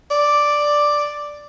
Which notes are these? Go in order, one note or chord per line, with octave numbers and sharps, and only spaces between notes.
D5